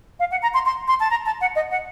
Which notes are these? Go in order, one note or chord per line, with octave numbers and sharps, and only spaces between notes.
F5
F#5
A#5
C6
C6
C6
A5
A#5
A5
F#5
D#5
F#5